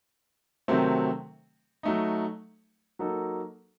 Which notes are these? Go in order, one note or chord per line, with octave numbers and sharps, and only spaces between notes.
C3 D#3 F#3 A3 C4
F#3 A3 D#4
F#3 A#3 D#4 F#4 A4